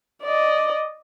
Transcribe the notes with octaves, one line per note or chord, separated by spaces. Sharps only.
D5 D#5